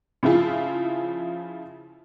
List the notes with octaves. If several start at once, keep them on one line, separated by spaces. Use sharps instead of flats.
C#3 F3 E4 F4 G#4